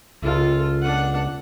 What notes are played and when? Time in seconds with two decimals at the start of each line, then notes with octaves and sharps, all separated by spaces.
0.23 C#2 F4 A4
0.82 D4 F#5